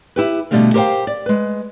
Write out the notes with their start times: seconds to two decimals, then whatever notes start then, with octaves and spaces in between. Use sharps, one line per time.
0.16 E4 G4 B4
0.51 B2 D3 D#3 G3 A3 F5
0.74 G4 A#4 C5 D#5 F5 G5
1.07 D5
1.26 G#3 B4